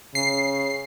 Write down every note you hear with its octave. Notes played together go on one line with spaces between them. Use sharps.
C#3 C7